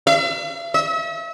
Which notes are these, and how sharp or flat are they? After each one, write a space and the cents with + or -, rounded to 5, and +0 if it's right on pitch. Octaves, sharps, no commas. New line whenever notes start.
E5 +45
E5 -40